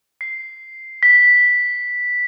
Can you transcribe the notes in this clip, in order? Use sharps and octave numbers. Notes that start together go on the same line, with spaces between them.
C7
B6